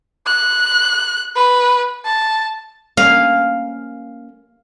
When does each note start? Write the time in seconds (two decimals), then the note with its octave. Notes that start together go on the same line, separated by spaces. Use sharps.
0.27 F#6
1.35 B4
2.05 A5
2.97 A#3 C#4 F5